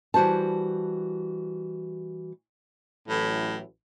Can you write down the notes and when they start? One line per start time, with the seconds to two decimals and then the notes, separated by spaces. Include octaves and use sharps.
0.14 E3 G3 F#4 C5 A5
3.08 A1 A2 E3 F#3